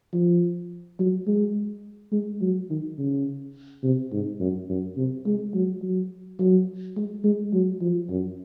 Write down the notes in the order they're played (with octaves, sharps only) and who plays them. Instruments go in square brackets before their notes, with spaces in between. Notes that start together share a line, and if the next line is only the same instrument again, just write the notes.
[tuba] F3
F#3
G#3
G#3
F#3
D#3
C#3
C3
G#2
F#2
F#2
C3
G#3
F#3
F#3
F#3
G#3
G#3
F#3
F3
F#2